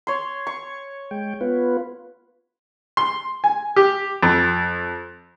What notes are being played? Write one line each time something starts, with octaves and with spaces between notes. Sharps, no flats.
C#5 C6
C#6
G#3 G5
B3 F4 B4
C6
G#5
G4
F2